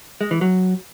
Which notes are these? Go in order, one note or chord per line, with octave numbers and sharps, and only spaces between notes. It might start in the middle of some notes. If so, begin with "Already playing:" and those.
G#3
E3
F#3